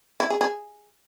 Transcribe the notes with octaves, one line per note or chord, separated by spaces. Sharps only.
E4
G#4
G#4